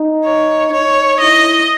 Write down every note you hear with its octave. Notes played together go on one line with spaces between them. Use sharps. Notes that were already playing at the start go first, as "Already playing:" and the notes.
Already playing: D#4
C#5
D#4 C#5
E4 D#5